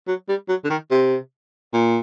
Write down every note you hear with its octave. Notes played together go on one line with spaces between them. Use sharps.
F#3
G3
F#3
D3
D#3
C3
A#2